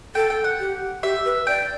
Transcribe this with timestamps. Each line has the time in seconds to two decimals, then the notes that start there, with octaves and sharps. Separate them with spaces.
0.15 A4 G5
0.30 G5
0.44 F#5
0.59 G4
1.03 G4 E5
1.25 B4
1.47 D5 G5